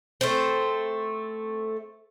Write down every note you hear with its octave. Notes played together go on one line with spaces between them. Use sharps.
A3 C4 C5